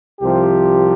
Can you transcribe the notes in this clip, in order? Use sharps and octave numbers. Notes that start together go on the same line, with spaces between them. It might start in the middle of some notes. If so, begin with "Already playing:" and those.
C2 C3 F3 G4